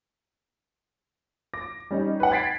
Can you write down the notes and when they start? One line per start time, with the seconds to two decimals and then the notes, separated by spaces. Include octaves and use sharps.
1.54 D6 A#6
1.91 G3 C#4 D#4
2.20 B4 F#5
2.32 G#6 A6 B6 C7 D7